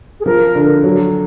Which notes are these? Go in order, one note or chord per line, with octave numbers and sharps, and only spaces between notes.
G#4
F3 A#4
D3
F#3